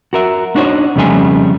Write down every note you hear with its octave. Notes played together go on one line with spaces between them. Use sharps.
F#4 A#4 E5
D4 D#4 F#4 C5 C#5
F2 C#3 G3 A3 D#5 G#5